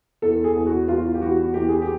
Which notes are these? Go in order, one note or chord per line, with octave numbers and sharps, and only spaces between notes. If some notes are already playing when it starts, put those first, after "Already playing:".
E2 A4
G#4
E2
F#4
E2 F4
G4
E3 F#4
E2 G4
G#4
G4